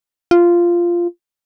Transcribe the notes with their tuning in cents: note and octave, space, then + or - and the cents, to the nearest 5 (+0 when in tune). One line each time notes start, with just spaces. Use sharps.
F4 -10